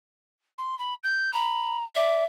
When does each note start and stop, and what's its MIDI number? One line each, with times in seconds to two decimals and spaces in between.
0.58 0.77 84
0.79 0.94 83
1.03 1.33 91
1.33 1.84 82
1.33 1.77 83
1.95 2.23 74
1.95 2.24 76